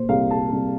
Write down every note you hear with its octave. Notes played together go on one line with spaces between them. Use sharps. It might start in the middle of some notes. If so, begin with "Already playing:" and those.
Already playing: A#2 C5
C2 F5
A5
C2